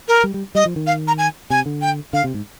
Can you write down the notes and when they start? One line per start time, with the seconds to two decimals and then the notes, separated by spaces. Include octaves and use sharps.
0.08 A#4
0.24 G3
0.34 G3
0.55 G3 D#5
0.66 F3
0.76 D#3
0.87 F5
1.08 A#5
1.18 G#5
1.50 C3 G#5
1.66 D3
1.82 G5
2.13 D3 F5
2.24 C3
2.34 G#2